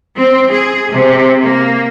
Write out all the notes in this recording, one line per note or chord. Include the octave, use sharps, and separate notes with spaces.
C4
G#4
C3
A#3